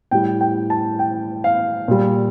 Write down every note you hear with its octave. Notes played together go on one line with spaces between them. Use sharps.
A2 G3 G5
G5
A5
G5
F5
A#2 G3